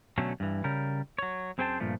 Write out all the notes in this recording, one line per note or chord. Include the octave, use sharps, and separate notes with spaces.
B2 D3 F#3 A3 C#4
G2 E3
C#3 G3 A#4
F#3 C#5
F#2 C4 G#4 C5 G5 A5
G2 A#2 F3 A3